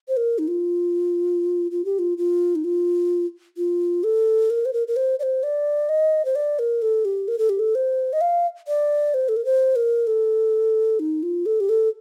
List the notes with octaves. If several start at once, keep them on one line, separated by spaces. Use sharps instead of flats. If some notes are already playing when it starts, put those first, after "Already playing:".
C5
A#4
D#4
F4
F4
G4
F4
F4
D#4
F4
F4
A4
A#4
C5
A#4
A#4
C5
D5
C5
D5
D#5
C5
D5
A#4
A4
G4
A#4
A4
G4
A4
C5
D#5
F5
D5
C5
A4
A#4
C5
A#4
A4
D#4
F4
A4
G4
A4